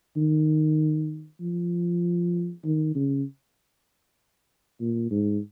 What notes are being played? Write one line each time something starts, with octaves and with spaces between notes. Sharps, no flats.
D#3
F3
D#3
C#3
A#2
G#2